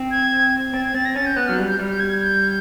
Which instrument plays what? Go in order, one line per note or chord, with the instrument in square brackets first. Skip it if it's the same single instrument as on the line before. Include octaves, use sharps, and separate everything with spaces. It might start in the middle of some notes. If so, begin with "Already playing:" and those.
Already playing: [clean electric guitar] C4
[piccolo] G#6
[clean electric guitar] C4 [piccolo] A6
[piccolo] G#6
[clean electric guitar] C4 [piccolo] A6
[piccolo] A#6
[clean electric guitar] C#4 [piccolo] A6
[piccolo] G6
[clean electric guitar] B3 [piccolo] F#6
[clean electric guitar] F#3 [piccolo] F6
[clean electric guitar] G3
[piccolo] G6
[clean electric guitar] G3
[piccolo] G6
G#6
G6